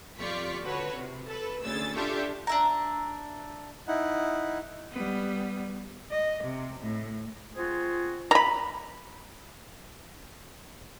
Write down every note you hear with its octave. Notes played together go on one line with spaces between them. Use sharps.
F2 F4 G4 D5 C#6 B6
D3 F#4 A4 B4 C#5
C3
A4 B4
D2 C#3 E6 A6
D4 F4 G4 A4 E5 C#6
D4 E5 A#5
D#4 E4 F#5
G3 B3
D#5
C3
A2
C4 F4 F#4 G#4
A#5 B5